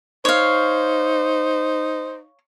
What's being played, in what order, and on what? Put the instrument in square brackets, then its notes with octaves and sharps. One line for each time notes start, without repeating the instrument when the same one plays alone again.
[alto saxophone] D#4 [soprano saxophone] C5 [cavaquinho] C#5 F5